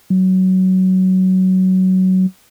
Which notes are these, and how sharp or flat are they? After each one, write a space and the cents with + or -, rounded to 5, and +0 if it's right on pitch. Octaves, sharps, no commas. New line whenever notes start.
F#3 +15